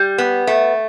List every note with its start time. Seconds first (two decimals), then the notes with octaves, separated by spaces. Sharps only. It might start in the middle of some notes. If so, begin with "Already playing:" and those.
Already playing: G3
0.18 B3
0.47 A3